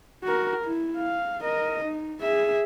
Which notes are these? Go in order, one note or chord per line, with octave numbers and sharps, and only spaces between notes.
F#4 A#4
E4
F5
A#4 D#5
D#4
G#4 E5